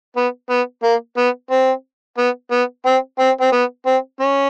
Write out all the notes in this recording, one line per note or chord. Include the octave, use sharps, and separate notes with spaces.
B3
B3
A#3
B3
C4
B3
B3
C4
C4
C4
B3
C4
C#4